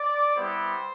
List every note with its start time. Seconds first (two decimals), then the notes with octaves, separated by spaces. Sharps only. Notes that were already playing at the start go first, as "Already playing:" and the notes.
Already playing: D5
0.34 G3 B3 E4 G4 C5